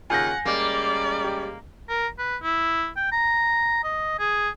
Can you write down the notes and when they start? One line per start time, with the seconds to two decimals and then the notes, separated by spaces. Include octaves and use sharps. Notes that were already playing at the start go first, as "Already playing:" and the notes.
0.10 D#2 C#3 F4 F#5 G#5 G6 A#6
0.45 G3 G#3 A#3 C#4 D5
1.24 G4
1.89 A#4
2.19 B4
2.43 E4
2.96 G5
3.12 A#5
3.84 D#5
4.19 G#4